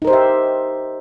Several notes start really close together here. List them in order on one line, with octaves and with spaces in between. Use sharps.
D#4 A#4 C5 G4 E5